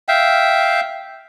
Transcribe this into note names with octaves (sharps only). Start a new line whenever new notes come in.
E5 F5 G5